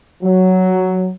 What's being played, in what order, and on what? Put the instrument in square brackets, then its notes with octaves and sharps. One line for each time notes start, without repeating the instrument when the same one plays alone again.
[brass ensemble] F#3